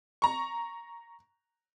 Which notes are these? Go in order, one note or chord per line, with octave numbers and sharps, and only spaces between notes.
A#5 C#6